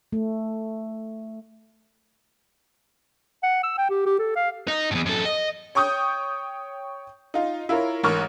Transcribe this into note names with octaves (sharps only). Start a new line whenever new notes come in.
A3
F#5
E6
G5
G4
G4
A4
F5
D#4
E2 G2
F#2 A4
D#5
C#5 G5 C#6 D#6 G6
D#4 F4
E4 F4 A#4 C#5
A1 G#2 A#4 C#6 F6